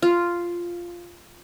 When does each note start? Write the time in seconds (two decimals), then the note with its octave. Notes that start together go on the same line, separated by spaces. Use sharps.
0.02 F4